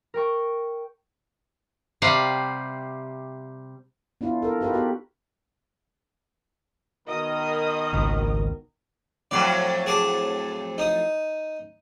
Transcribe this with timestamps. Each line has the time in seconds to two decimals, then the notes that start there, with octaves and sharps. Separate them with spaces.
0.14 A#4 G5 C#6
2.02 C3 G3 F5 F#5
4.21 B3 D4 E4 F4
4.42 A4 A#4
4.61 D#4 F4 G4 A#4 B4
4.73 B3 F#4 G4
7.07 B2 D#3 A#4 D#5 D#6
7.93 G#1 C#2
9.31 F2 A2 F#3 D5
9.86 G#4 A5 D6
10.78 D#4 D#6